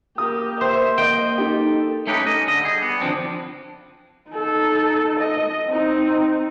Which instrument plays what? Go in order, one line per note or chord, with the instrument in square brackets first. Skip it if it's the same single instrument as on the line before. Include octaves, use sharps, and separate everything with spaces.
[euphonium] A#3 [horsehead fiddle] G4 A#4 [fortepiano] D#6
[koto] C5 [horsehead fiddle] E5
[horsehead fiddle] D#5 [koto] G5
[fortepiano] D#4 G4 [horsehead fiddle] A4
[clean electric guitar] A3 C#4 D#4 G4 A#4 B4
D#5
D3 D#5
G3 G#4
B3
D3 F3 F#3 C4 D4
[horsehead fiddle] D#4 A4
D#5
C4 D#4